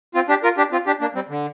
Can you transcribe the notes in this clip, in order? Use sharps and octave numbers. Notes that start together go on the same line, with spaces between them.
C4 F4
D4 G4
F4 A#4
D4 G4
C4 F4
D4 G4
A#3 D4
G3 C4
D3